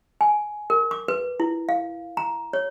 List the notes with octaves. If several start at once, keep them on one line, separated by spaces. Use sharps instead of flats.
G#5
A#4
D6
B4
E4
F5
A#5
C#5